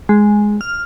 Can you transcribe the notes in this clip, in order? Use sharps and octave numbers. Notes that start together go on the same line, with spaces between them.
G#3
F6